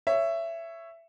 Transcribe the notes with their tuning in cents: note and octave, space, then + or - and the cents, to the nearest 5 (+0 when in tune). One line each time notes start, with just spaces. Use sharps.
C#5 +0 E5 +15